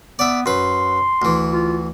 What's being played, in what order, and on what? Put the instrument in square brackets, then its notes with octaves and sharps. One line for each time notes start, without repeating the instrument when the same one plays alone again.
[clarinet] B3 [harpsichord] D5 E5
[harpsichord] F#2 B4 [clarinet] C6
[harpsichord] D2 E3
[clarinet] F4